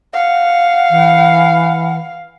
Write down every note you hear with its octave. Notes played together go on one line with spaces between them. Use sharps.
F5 F#5
E3